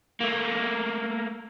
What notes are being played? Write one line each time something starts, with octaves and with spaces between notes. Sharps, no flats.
A3 A#3